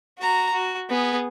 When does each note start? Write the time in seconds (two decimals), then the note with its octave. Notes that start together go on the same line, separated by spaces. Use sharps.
0.19 F#4 A#5
0.53 F#4
0.90 B3 G#4